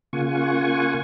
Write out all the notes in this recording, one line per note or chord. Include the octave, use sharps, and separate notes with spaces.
C#3 A#3 F4 F#5 G#5 C#6